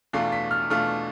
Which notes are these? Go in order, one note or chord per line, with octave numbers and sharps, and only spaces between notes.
E2 B2 A3 D4 F4 C7
B6
F6
E2 B2 A3 D4 F4 F6